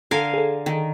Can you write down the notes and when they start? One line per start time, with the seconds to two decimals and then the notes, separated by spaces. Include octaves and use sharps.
0.11 D3 A#4 F5 G#5
0.34 G#4 A4
0.66 D#3